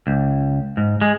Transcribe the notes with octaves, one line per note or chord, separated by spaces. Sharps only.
C#2
G#2
G#3